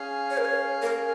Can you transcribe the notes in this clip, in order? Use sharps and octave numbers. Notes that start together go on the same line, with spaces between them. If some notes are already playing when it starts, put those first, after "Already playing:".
Already playing: C#4 G#4 F5
C#5
A#4
C#5
A#4